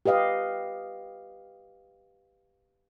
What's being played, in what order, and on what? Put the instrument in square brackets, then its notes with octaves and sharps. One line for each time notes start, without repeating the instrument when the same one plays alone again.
[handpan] G4 B4 D#5 F5